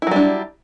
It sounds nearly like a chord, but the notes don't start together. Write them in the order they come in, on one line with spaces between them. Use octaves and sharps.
E4 F#3 G3 D4